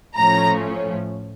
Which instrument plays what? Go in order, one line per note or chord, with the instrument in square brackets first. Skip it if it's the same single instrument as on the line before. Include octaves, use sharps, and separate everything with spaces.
[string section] A2 F3 A3 C#4 A#5